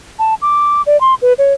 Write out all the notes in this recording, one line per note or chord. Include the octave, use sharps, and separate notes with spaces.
A5
D6
D5
C6
B4
C#5